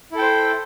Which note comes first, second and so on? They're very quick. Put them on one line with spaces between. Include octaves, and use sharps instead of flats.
E4 A4 G5 C5